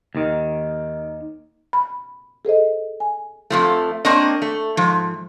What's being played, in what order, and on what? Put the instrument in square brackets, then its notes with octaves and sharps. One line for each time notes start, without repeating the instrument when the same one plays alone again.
[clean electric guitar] D#2 D#3
[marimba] B5
G#4 A4 C5 D#5
G#5
[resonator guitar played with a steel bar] F2 F3 A3
A#3 C4 D4 A#4 C#5 D#5
A3
G#2 F3